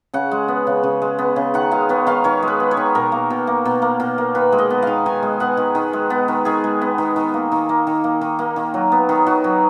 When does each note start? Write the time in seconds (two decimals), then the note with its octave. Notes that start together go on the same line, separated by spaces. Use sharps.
0.14 C#3 F#5
0.31 G#3
0.48 B3
0.67 C#3
0.84 C#3
1.02 G#3
1.19 B3
1.36 C#3
1.54 D#3 F#5
1.71 G#3 F5
1.89 B3 C#5
2.07 D#3 F5
2.24 D#3 C#5
2.43 G#3
2.48 B4
2.60 B3
2.71 C#5
2.77 D#3
2.95 B2 A#4
3.12 A#3
3.30 B2
3.47 A#3
3.65 B2
3.82 A#3
4.00 B2
4.18 A#3
4.35 D#3 B4
4.52 G#3
4.58 D#5
4.70 B3
4.82 D#3 F5
5.06 D#3 G#5
5.23 G#3
5.40 B3 F#5
5.57 D#3
5.75 D#3
5.93 G#3
6.10 B3
6.28 D#3
6.45 D#3 G#4
6.64 G#3
6.81 B3
6.98 D#3
7.16 D#3
7.34 A#3
7.52 D#3
7.69 A#3
7.87 D#3
8.04 A#3
8.21 D#3
8.39 A#3
8.56 D#3
8.74 F#3
8.92 B3
9.09 D#3
9.26 D#3 F#4
9.44 F#3